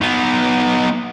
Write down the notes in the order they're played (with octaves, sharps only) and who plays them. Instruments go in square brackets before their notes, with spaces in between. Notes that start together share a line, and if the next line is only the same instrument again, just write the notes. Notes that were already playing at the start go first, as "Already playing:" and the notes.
[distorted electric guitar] B3 D#4